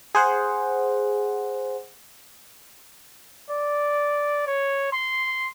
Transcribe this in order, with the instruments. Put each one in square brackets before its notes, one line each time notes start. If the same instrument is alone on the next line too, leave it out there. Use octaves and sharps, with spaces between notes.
[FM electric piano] G#4 C5 F#5
[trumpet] D5
C#5
C6